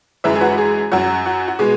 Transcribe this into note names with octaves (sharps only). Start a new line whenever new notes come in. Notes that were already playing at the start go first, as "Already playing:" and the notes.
F#2 E3 G#3 B4 E5
G#4
F#4 B4
G#4
F#2 F#3 F#4
F#4
F#4
B2 G#3 G#4